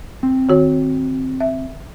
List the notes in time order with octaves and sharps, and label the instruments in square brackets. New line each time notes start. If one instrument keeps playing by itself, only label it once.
[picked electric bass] C4
[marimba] D#3 F#4 C#5
E5